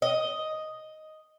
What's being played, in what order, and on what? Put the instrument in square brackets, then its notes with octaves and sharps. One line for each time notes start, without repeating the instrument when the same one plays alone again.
[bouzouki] D#5